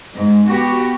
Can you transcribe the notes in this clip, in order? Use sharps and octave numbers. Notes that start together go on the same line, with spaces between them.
G#2
B3 F#4 G4